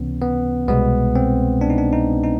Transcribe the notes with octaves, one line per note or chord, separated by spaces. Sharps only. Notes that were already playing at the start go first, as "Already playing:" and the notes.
Already playing: C#2 C3 E3 B3 C#4
B3
C2 B2 G#3 B3
C4
D4
D#4
D4
D#4
D#4